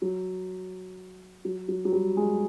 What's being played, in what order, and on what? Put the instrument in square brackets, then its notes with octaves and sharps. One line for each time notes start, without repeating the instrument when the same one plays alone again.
[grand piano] F#3
F#3
F#3
F#3
G3
G#3